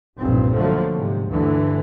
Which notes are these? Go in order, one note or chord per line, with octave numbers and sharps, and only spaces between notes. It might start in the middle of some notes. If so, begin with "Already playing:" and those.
F1 B1 G2 A#2 C4
D3 F3 F#3 A3 A#3
G#2 C3
D2 G2 D3 E3